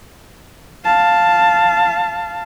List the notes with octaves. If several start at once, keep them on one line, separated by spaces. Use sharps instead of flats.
F5 A5